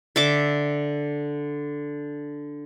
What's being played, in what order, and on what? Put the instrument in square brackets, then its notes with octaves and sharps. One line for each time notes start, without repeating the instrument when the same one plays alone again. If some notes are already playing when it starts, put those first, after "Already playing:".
[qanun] D3 E5 D6